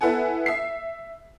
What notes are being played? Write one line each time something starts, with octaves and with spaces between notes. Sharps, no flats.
B3 E4 A4 F#5 G#5
E5 C7